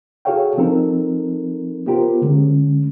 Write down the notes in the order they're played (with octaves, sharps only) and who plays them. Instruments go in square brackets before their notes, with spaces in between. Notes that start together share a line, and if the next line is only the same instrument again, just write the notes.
[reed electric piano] F#4 G#4 A4 C#5 F5 G5
F3 C4 D#4 A4 A#4
B3 F4 G4 A#4 C5
D3 G#3 C#4